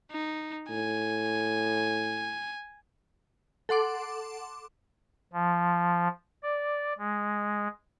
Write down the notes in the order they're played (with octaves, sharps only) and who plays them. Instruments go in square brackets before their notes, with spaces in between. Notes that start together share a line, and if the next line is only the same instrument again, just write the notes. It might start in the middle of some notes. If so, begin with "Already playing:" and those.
[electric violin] D#4
[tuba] A2 [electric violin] G#5
[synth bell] A4 F#5 C6 D6
[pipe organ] F3
D5
G#3